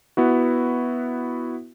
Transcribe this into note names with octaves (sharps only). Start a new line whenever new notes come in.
B3 E4 F#4